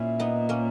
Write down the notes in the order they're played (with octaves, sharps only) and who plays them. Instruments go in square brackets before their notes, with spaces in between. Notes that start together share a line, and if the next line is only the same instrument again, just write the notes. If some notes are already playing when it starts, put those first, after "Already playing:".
Already playing: [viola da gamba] A#2 [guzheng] C#4 E4
[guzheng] B3 D#4
A#3 C#4